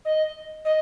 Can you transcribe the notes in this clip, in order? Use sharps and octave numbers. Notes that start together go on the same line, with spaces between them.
D#5
D#5